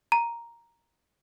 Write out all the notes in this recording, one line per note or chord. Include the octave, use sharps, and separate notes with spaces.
A#5